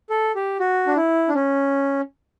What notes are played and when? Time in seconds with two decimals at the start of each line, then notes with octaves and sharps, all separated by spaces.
0.10 A4
0.35 G4
0.60 F#4
0.87 D4
0.96 E4
1.29 D4
1.34 C#4